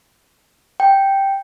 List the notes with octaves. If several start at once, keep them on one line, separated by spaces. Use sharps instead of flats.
G5